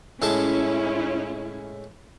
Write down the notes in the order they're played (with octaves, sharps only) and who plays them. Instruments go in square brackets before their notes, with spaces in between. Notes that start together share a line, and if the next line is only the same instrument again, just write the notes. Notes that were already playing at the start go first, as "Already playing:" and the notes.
[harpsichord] A2 G#3 A5 [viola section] C#4 E4